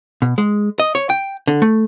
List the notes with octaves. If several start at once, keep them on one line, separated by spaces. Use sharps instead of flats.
B2
G#3
D#5
C#5
G5
D3
A3